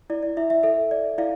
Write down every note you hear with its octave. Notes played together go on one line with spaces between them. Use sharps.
E4 D5
D5
E4 E5
E5
A4 E5
D5
E4 D5 F5